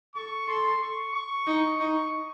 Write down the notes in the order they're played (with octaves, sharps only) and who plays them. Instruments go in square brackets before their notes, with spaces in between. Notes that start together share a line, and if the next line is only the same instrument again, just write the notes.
[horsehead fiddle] A4 [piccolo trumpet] C#6
[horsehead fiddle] A4 [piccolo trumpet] C6
[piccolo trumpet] C#6
C#6
[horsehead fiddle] D#4
[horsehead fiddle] D#4 [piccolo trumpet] C#6